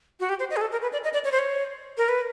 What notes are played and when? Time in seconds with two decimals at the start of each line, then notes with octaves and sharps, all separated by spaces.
0.20 F#4
0.29 G4
0.40 C5
0.50 D#5
0.56 G#4
0.61 A4
0.72 A#4
0.82 B4
0.93 D5
1.04 D#5
1.13 D5
1.25 C#5
1.32 C5
1.39 C#5
1.98 A#4
2.09 B4